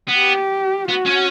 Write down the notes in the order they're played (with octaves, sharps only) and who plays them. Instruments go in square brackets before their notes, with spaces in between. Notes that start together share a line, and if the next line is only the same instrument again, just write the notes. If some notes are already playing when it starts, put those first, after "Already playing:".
[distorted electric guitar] B3
[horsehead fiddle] G4
[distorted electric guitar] B3 [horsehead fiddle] F#4
[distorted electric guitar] C#4